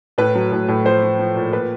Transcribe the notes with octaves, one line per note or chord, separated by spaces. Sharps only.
A2 B4
F#3
A2
A2
F3 C5
F3
F3
A#2
A#2 B4